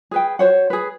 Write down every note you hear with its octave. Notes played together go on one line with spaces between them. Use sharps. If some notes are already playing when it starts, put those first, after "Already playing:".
G#4 B4 G5
F#4 C5 C#5 F#5
G#4 B4